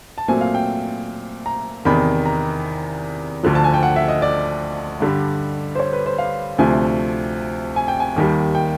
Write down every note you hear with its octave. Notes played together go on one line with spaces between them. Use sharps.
A5
A#2 F#3 A3 C4 G#5
F5
G5
A#5
E2 C3 D#3 B5
A#5
D2 D3 F3
A5
G#5
G5
F#5
E5
D#5
D5
G2 D3 G3
C5
C#5
B4
C5
F5
D2 C3 F3 A3 C4 G#5
G#5
G5
G#5
D#2 D#3 G3
G5